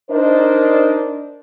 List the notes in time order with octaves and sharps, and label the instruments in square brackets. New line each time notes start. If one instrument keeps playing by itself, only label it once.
[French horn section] D4 D#4 A#4 C5 D5 D#5